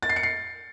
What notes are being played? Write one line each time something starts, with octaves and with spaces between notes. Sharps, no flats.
A6
C7
C#7
C7